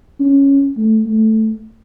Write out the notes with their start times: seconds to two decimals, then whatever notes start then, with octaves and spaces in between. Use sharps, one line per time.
0.20 C#4
0.77 A3
1.06 A3